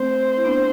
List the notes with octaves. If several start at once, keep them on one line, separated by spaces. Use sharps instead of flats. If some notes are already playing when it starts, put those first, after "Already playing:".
Already playing: A3 C4 C5
E4
B3 D4